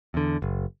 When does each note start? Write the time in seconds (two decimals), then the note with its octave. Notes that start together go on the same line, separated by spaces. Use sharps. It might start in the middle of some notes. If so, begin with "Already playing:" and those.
0.14 E2 D3
0.42 F#1